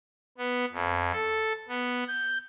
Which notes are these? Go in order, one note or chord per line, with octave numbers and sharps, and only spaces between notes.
B3
F2
A4
B3
G6